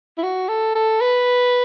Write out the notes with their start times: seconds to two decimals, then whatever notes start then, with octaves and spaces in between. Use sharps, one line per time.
0.18 E4
0.23 F#4
0.49 A4
0.75 A4
1.01 B4